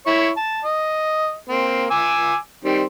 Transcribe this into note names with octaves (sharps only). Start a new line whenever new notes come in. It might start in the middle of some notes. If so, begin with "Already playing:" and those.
E4 C#5 C#6
A5
D#5
A#3 C4
G#5 D6 E6
D#3 G3 C4